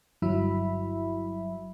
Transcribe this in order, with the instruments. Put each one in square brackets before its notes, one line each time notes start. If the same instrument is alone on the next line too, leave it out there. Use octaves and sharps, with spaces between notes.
[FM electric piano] G1 G2 F#3 E4 E5 B5